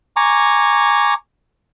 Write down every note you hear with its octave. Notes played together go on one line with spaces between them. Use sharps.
G#5 A#5 C#6 D6